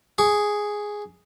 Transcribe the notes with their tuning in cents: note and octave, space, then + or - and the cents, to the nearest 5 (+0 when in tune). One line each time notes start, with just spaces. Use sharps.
G#4 +0 C#6 +30